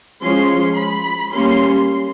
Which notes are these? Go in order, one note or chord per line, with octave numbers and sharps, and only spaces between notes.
F3 G#3 C#4 C6
B5
G3 A#3 C#4 C6